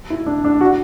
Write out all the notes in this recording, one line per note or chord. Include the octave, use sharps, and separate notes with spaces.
E4
D4
D4
F#4